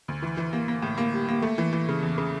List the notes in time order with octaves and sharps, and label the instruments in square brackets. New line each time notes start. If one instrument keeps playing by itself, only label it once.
[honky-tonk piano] D2
E3
E3
A#3
A#3
A2
A#3
G3
A#3
A3
E3
E3
C#3
E2
C#3